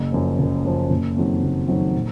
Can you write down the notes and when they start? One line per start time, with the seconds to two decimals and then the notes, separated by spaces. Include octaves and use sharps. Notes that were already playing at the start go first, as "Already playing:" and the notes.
Already playing: F#1
0.12 F#2 F3
0.39 F#1
0.65 F#2 F3
0.90 F#1
1.17 F2 D#3 F#3
1.42 F#1
1.68 F2 D#3 F#3
1.94 A#2